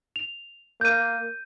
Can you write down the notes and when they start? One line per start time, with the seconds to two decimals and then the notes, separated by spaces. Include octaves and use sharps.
0.16 F7
0.81 A#3 G6 D#7